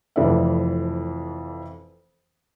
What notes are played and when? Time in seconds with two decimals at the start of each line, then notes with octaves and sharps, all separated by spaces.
0.16 F1 F2 E3 B4 D5 E5